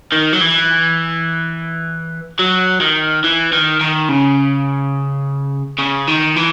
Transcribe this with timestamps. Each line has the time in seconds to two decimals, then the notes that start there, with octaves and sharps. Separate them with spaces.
0.12 D#3
0.33 F#3
0.41 E3
2.39 F#3
2.81 D#3
3.24 E3
3.53 D#3
3.81 D#3
4.09 C#3
5.79 C#3
6.07 D#3
6.36 E3